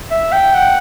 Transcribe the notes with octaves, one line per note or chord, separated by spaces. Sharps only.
E5
G5
F#5